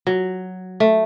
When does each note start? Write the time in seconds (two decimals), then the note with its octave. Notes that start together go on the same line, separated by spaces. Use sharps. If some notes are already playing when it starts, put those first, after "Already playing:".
0.07 F#3
0.80 A3